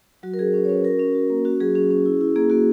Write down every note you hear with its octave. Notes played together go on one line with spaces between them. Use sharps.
F#3 F#4
A#4
C#4 G#4
C#4
C#5
C#4 B4
F#4 A#4
C#4
F#4
A#3
C#4 F#4
F#3 G#4
C#4 G#4
C#4
E4
E4
A#3 G#4
A#3 F#4